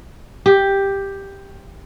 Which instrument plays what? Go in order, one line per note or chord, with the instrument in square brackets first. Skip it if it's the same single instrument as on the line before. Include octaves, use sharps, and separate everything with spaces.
[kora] G4